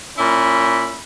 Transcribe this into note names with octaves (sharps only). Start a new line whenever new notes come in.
A#2 C#4 E4 B5